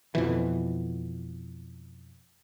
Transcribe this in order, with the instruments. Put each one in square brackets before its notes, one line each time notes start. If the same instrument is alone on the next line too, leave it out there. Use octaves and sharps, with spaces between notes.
[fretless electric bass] F2 B2 E3